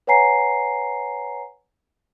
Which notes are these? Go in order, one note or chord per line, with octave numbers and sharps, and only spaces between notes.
B4 C#5 F#5 G#5 A#5 C7